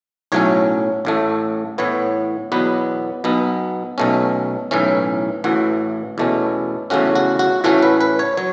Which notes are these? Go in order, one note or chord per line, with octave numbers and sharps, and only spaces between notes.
B1 A2 F#3 A3 C#4 C#5
A1 A2 A3
A2 E3 B3 C#5
E2 B2 F#3 B3 B4
B1 B2 B3
B1 B2 A3 C#4
B1 A2 E3 C#4
A1 A2 E3 F#4
E2 B2 A3 C#4
E2 C#3 A3 C#4 F#4
F#4
F#4
A2 E3 A3 C#4 F#4
B4
B4
C#5
F#3 C#5